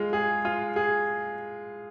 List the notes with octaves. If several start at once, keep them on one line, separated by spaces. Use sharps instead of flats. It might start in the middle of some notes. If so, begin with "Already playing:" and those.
Already playing: G#3 F4
G#4
F4
G#4